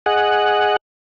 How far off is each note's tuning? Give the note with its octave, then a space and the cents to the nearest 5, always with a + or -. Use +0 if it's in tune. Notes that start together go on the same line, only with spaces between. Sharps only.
G#4 +5 D#5 -10 F#5 +0